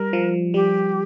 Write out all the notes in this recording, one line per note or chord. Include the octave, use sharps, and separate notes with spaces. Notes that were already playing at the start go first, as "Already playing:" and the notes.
Already playing: G3 A#4
F3
G3 G4